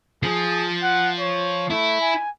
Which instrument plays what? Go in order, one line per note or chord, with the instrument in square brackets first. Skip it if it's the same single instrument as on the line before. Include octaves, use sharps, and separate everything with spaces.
[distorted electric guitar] F3 [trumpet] G#4
[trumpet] F#5
C#5
[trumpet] A3 [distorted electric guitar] E4
[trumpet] G#5